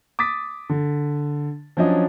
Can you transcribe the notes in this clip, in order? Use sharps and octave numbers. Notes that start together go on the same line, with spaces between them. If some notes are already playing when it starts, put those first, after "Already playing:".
D6 D#6 A6 B6
D3
F3 F#3 C#4 D4 D#5